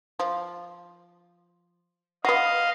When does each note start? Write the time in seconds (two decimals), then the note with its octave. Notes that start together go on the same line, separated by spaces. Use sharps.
0.20 F3
2.25 B3 F#4 D#5 F5